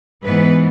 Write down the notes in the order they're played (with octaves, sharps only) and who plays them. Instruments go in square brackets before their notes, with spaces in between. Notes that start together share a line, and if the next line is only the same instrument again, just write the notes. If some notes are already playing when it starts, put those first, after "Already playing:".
[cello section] G#2 E3 B3 B4